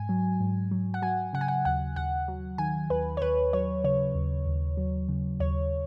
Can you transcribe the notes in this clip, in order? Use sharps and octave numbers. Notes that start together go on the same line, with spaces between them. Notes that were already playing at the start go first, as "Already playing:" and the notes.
Already playing: G#2 G#5
F#3
G#2
F#3
F#5
F#3 G#5
C#3 F#5
G#5
F#5
D#2 F#5
D#2 F#5
F#3
D#3 G#5
D#2 B4
C#5
D#2 B4
F#3 C#5
C#3 C#5
D#2
D#2
F#3
C#3
D#2 C#5